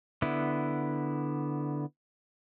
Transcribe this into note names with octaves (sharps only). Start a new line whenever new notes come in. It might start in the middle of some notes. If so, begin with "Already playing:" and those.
D3 B3 E4